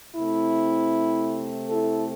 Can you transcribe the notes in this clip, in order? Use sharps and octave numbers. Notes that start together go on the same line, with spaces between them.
C3 A3 C4 E4
E4 A4